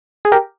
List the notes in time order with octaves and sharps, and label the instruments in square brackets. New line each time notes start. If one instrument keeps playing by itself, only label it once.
[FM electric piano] G#4
G4 A#4